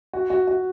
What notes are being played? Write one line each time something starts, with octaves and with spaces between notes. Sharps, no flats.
F#4
F#4
F#4